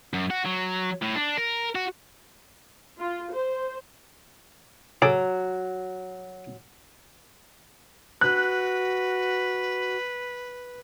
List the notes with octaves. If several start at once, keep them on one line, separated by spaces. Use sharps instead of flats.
F#2
F#4
F#3
A2
D4
A#4
F#4
F4
C5
F#3 G#4 A4 D6
F#4 B4 F#6